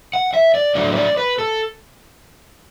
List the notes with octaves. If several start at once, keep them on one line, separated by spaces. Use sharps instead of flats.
F#5
E5
D5
A2 F#3 A3 D4 D5
B4
D5
B4
A4